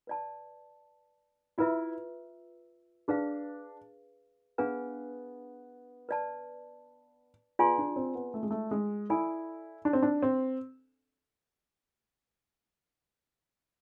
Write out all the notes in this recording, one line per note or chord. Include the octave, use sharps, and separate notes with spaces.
B4 D5 A5
E4 F4 B4 E5
D4 G#4 B4 F5
B3 D4 G#4 B4 F5 G#5
B4 D5 A5
B3 F4 G#4 D5 G#5 C6
D4
C4
B3
A3
G#3
A3
G#3
E4 A4 D5 G#5 B5
D4
C4
D4
C4